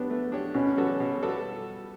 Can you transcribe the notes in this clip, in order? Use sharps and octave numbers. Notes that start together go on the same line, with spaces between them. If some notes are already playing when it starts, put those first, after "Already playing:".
Already playing: B3 D4 G4 C#5
A3
D4 G4 C#5
B2 C#4
G3 B3 F#4 A4
B2
G3 B3 F#4 A4